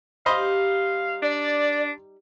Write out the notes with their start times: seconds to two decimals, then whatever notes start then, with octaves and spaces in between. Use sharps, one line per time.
0.26 G3 D#4 G4 C5 D#5 F5 B5
1.22 D4 D5